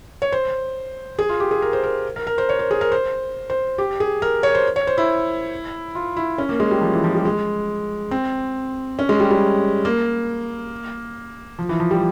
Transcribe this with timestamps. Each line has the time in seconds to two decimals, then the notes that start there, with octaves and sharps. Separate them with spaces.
0.22 C#5
0.32 C5
1.19 G#4
1.29 F4
1.40 G4
1.51 G#4
1.62 A#4
1.73 C5
1.83 A#4
2.16 A#4
2.27 A#4
2.38 C5
2.49 C#5
2.59 C5
2.71 G#4
2.81 A#4
2.92 C5
3.50 C5
3.78 G4
4.00 G#4
4.22 A#4
4.43 C#5
4.55 C5
4.76 C#5
4.87 C5
4.98 E4
5.95 F4
6.17 E4
6.38 C#4
6.49 A#3
6.60 G#3
6.71 G3
6.81 F3
6.93 E3
7.04 F3
7.14 G3
7.25 G#3
8.11 C4
8.99 C#4
9.09 G#3
9.20 G3
9.31 G3
9.85 A#3
11.59 F3
11.69 E3
11.80 F3
11.91 G3